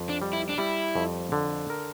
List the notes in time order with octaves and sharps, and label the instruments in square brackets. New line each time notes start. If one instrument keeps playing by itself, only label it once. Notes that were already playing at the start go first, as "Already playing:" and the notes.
Already playing: [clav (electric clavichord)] F2
[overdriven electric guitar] D4
[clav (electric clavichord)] G3
[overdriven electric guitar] E4
D4
[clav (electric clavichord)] G3 [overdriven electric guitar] E4
[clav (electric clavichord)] F2
D3
A#4